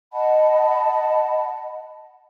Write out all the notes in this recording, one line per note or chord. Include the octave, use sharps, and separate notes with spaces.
D#5 F#5 A5 B5